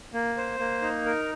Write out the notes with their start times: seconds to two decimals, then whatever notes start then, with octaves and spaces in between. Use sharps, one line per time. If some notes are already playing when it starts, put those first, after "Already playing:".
0.13 A#3
0.37 C5
0.60 A#3
0.82 D#4
1.06 A#4